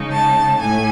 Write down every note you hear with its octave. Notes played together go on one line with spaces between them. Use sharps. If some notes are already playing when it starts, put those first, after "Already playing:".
Already playing: C#3 G#3 D#4
A5
A2 G#5